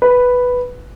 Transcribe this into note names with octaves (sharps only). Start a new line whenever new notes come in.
B4